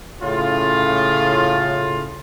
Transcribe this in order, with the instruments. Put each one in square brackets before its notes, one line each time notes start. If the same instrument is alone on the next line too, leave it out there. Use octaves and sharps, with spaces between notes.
[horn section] A2 C#3 F4